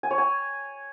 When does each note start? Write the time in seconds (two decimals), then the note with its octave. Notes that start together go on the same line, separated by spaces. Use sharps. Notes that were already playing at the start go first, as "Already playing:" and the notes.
0.03 G#5
0.11 C#5
0.18 G#5